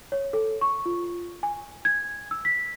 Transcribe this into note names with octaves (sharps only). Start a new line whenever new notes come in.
C#5
A4
C#6
F4
G#5
G#6
E6
B6